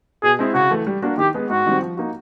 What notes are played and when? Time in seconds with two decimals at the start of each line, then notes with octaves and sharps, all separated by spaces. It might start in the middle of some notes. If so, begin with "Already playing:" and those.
0.23 B2 G#4
0.39 G#3 C4 E4
0.54 C#3 F#4
0.71 E3 A3
0.87 G3
1.02 A#3 D4 F#4 A#4
1.18 D#3 G4
1.34 G#3 B3
1.50 G#2 F#4
1.66 D#3 G3 C4
1.82 F3
1.97 A#3 D#4 F#4